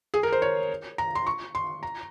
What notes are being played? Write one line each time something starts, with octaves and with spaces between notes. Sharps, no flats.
G#4
A#4
C5
C#5
A#5
C6
C#6
C6
A#5